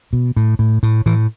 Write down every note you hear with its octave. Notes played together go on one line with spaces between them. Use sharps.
B2
A2
A2
A2
A2 E3